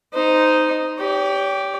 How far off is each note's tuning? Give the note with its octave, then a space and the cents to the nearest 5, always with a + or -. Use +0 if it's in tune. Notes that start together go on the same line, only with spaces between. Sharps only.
D#4 +0 C5 -15
G4 +0 C#5 +45